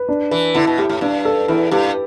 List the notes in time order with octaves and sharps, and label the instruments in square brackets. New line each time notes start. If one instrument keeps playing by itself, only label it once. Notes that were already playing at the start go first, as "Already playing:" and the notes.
Already playing: [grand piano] B4
D4
[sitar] E3 [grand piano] B4
[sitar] D3 [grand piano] E4
[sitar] B2
[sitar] A2 [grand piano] G4
[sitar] A2
[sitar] G2 [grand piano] D4
[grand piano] A4
[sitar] E2 [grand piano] E4
[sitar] G2 [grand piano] G4